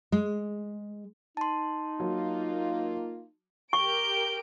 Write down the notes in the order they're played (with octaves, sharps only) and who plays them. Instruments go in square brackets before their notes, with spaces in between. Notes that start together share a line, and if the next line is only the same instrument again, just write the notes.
[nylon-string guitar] G#3
[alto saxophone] D#4 [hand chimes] A5 C6
[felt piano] F#3 [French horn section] A#3 F4
[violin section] G4 A#4 D7 [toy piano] C#6 [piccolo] G7